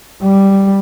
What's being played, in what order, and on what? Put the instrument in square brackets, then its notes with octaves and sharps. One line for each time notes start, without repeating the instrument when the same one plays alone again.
[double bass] G3